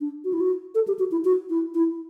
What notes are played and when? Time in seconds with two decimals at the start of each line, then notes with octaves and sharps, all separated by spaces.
0.01 D4
0.24 F#4
0.33 E4
0.40 F#4
0.75 A4
0.88 G4
0.99 F#4
1.12 E4
1.25 F#4
1.50 E4
1.74 E4